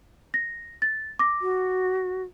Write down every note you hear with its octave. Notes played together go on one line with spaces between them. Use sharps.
A#6
A6
D6 A#6
F#4